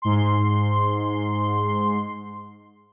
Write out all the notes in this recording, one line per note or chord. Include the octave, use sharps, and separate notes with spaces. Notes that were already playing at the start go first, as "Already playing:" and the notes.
G#2 C6